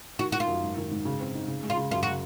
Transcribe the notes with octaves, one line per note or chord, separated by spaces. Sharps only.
D#3 F#4
D#3 F#4
F4
F#2
G#2
D#3
G#2
C#3
C4
D#4
C#3
G#3
F4
C#3
F#2 F4
C#3 F#4